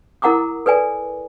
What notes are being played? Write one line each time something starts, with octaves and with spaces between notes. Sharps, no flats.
E4 A#4 F#5 A#5 D6 D#6
A4 B4 D5 G#5